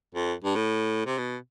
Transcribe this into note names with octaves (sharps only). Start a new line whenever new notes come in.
F2
G2
A2
C3
B2